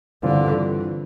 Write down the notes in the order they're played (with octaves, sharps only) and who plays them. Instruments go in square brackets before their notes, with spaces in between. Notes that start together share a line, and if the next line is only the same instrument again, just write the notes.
[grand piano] G2 E3 G3 C4 F4 [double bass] D3